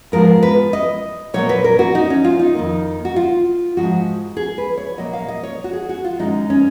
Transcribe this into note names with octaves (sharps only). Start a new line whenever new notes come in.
G#2 F3 G#3 B3 A#4
B4
D#5
A#2 F#3 A#3 C#5
B4
A#4
F#4
D#4
C#4
F4
D#4
F2 D#3 A#3
F#4
F4
G#2 F3 G#3 F#4
G#4
B4
C#5
A#2 F#3 A#3 D#5
F5
D#5
C#5
F#4
G#4
F#4
F4
F#2 D#3 G#3 D#4
C#4